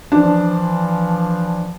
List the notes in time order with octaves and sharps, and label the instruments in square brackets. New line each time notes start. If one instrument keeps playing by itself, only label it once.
[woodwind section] E3 F3 [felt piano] D4